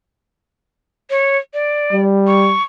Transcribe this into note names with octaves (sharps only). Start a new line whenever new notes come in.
C#5
D5
G3
C#6